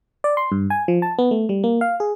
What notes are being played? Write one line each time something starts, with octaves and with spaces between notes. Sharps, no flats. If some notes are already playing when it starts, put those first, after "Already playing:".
D5
C6
G2
G#5
F3
A5
B3
A3
G3
A#3
F5
G#4